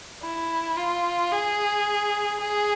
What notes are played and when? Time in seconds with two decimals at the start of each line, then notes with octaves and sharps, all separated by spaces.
0.23 E4
0.77 F4
1.32 G#4
2.41 G#4